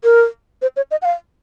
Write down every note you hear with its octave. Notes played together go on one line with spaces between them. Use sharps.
A#4
C5
C#5
D#5
F#5
F5